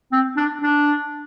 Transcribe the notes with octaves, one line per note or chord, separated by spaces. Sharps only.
C4
D4
D4